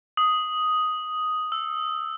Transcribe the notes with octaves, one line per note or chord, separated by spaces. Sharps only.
D#6
E6